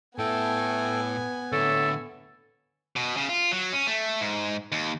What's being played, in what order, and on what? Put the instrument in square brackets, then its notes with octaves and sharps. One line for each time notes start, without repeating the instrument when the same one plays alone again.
[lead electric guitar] A2 E4 [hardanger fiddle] B3 G#5 [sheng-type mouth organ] A4 G5
[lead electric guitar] A2 D3 [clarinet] A4 [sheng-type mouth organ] C#5 E5 C#6
[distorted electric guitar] B2
C#3
F4
F#3
C#4
A3
G#2
D#2